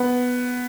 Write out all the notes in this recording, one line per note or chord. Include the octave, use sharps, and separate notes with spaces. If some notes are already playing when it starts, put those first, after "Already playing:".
Already playing: B3